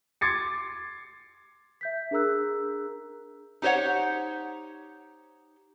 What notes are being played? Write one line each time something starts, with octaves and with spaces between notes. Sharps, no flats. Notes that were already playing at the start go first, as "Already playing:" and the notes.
C6 D6 G#6 A6 C7 C#7
E5 G6 B6
D4 G#4 A#4 A#5 E6 F#6
D#4 G4 C5 C#5 F#5